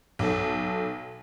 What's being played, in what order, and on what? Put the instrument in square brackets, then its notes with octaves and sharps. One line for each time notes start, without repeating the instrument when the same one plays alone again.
[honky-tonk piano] B1 A4